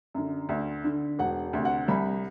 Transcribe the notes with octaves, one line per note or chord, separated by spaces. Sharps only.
F#2 D3
D2
D3
E1 F#5
D2 C3
F#5
C2 B5